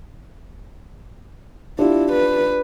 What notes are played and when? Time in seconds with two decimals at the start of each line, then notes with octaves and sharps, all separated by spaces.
1.79 D4 E4 F4 G4
2.12 B4